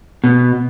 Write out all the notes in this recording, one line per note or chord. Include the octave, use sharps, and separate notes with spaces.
B2